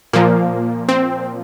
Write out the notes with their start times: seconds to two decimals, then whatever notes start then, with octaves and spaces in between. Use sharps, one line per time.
0.13 A#2 F3 A#3
0.89 C4